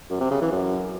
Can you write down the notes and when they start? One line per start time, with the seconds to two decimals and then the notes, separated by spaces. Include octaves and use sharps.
0.10 F#2
0.21 C3
0.31 C#3
0.41 E3
0.52 F#2